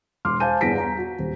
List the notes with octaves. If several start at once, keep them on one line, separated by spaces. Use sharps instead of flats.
E1 C6 D6 F6
C5 F5 G#5 A5 G6 D#7
G1 E2 B3 A#6 B6 D7
A#5
F#4
D#1